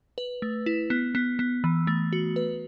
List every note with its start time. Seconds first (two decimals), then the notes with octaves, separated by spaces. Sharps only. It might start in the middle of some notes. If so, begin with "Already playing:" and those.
0.18 B4
0.42 A3
0.66 E4
0.90 B3
1.15 B3
1.39 B3
1.64 E3
1.87 A3
2.13 F#4
2.36 B4